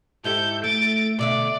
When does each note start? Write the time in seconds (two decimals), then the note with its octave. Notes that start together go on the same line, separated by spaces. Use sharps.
0.24 G#2 E4 G4 A4 G6
0.64 A3 A6 D7
1.19 B2 D3 D5 E5